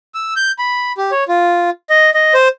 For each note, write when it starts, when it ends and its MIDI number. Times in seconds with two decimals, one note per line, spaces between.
0.14 0.34 88
0.36 0.52 91
0.59 0.92 83
0.98 1.11 67
1.12 1.24 73
1.28 1.70 65
1.90 2.10 75
2.14 2.34 75
2.34 2.48 72